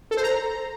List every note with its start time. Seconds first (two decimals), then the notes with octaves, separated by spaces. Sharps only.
0.11 A4
0.17 C5
0.23 A#5